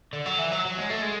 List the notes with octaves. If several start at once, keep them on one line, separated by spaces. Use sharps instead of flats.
D3
F#3
E3
F#3
F#3
G#3
A3
G#3